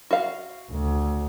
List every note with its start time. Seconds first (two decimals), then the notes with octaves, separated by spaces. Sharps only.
0.11 F#4 F5
0.72 D2